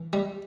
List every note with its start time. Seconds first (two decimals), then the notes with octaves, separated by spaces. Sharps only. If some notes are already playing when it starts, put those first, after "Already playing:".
Already playing: E3
0.13 G3